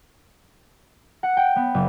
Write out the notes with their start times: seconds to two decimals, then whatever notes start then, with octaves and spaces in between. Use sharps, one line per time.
1.23 F#5
1.37 G5
1.56 B3
1.74 F#1